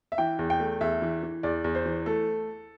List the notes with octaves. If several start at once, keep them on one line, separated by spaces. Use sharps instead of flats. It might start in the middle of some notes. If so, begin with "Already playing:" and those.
E5
E3 G5
E2
G5
A3
E2 E5
E3
E3
E2 D5
E2
C5
E3
A3 A4